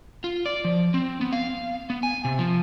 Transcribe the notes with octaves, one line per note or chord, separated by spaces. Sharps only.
F4
D5
F3
C4
B3
F5
B3
G#5
C3
F3